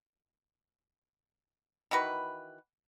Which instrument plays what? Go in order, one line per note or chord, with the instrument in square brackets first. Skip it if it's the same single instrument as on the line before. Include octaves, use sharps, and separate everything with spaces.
[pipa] D#3 E3 F#4 B4